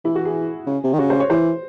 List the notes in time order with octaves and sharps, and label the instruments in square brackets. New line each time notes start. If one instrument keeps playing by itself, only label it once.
[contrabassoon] E3 [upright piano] E4
[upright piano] F#4
G#4
[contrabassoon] C#3
C3
D#3
[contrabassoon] C#3 [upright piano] F#4
[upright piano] C5
C#5
[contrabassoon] E3 [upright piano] C5